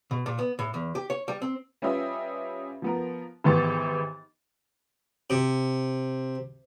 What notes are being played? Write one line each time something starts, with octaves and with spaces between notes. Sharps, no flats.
B2
A#2
B3
A2
E2
G4
C#5
G3
C4
G3 C#4 F4 B4 D#5 E5
F3 B3 A#4
G#1 E3 B3 G4 C#6 A6
C3